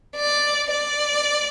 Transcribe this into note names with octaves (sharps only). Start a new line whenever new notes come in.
D5
D5